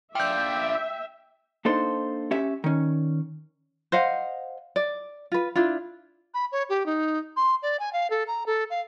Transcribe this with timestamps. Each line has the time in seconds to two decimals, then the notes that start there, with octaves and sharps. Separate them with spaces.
0.15 D4 F4 E5 G5 D6 G6
1.65 A#3 D4 D#4 A4 C5
2.31 C#4 G4 E5
2.64 D#3 C#4
3.92 C5 D#5 F5 F#5
4.76 D5
5.32 F4 B4
5.56 D4 E4 F4
6.34 B5
6.52 C#5
6.69 G4
6.86 D#4
7.36 C6
7.62 D5
7.79 G#5
7.93 F5
8.10 A4
8.27 A#5
8.46 A4
8.70 F5